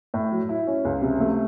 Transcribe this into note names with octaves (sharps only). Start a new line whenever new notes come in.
A2
F#3
E4
C#4
C#2
C3
A3